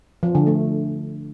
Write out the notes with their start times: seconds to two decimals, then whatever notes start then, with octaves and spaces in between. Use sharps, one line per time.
0.23 F3
0.35 D3
0.47 A3